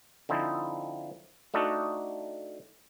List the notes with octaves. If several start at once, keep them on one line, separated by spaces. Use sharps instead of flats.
D3 F3 C4 D#4 E4
A3 D4 D#4 F#4 A4